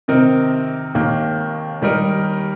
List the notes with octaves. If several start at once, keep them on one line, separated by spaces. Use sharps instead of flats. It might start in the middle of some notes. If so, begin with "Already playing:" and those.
C3 D#3 C4 D#4 A#4
D#2 D#3 A#3
D#3 G3 D#4 A#4